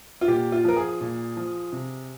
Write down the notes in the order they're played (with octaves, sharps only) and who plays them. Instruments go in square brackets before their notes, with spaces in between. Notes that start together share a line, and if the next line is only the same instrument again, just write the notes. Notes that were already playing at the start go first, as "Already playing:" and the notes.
[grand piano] F4
A#2 G4
F4
F3 A#4
G#4
A#2
F3
C3